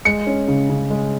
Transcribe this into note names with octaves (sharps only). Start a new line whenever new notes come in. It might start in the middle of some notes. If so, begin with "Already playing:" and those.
G#3 C#7
C#4
C#3
C#3
G#3